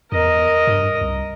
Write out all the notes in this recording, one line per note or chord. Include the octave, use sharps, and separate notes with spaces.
E2 A#4 D#5
G2
C2